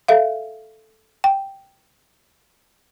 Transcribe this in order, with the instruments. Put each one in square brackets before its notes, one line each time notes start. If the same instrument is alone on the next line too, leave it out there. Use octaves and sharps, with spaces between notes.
[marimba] A4 E5 F5
G5